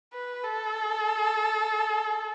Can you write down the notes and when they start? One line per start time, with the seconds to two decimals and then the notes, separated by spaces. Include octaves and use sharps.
0.13 B4
0.44 A4